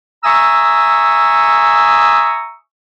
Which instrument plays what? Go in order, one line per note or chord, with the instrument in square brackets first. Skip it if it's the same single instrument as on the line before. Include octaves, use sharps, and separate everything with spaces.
[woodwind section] E5 G#5 A#5 C#6 D#6 E6